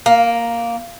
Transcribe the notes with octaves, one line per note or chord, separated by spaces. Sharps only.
A#3